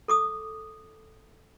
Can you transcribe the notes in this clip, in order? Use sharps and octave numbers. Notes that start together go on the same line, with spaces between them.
A4 D6 D#6